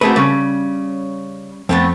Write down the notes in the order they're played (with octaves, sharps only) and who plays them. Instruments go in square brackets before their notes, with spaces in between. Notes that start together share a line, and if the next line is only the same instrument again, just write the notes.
[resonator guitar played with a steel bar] A3 A#3 C4 [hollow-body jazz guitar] F#4 G#4 B4
[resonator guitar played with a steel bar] C#3 [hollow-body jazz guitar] G3 C#4
[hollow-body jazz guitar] F2 [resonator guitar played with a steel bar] A3 B3 C4